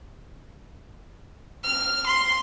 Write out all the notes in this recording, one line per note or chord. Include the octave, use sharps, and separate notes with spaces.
F6
C6